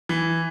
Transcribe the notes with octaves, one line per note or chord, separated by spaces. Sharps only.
E3